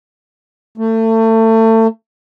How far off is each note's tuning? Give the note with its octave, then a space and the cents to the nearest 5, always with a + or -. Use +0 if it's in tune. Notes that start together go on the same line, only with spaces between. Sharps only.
A3 +30